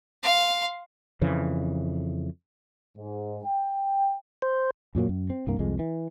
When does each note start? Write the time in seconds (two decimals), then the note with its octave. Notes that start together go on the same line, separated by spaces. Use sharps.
0.23 F5 C6
1.21 F2 C#3 E3
2.97 G#2
3.45 G5
4.42 C5
4.95 F#2 A#2 F#3 A#3
5.09 F#2
5.30 C4
5.47 C2 G2 A#3
5.59 C2 F2 G#3
5.79 E3